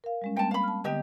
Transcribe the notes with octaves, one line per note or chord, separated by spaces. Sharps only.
A#4 F5
G3 G#3 C#4
G3 A#3 C4 G5 A5
F5 B5
A5 F6
D3 B3 G4 D#5 G5